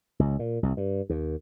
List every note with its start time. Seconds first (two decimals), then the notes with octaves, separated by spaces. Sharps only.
0.19 C#2
0.39 A#2
0.63 C2
0.77 G2
1.10 D#2